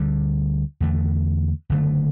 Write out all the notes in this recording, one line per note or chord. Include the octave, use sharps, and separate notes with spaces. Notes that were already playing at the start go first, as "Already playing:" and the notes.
Already playing: D2 D3 G3
E2 D3 A3
F#1 F#2 D3 A3